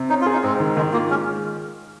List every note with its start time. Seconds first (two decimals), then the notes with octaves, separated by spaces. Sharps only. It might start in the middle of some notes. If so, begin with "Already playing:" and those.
Already playing: C3
0.09 C#4 D#4
0.21 F4
0.26 G#4
0.33 D#4
0.43 G#2 C4
0.60 D#3
0.76 D#3 G#3
0.93 A#3 F4
1.10 G#3 C#4